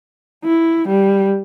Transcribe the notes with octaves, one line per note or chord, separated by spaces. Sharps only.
E4
G3